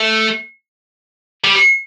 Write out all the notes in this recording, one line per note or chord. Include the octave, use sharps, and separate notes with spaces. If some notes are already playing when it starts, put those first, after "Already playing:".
Already playing: A3
G3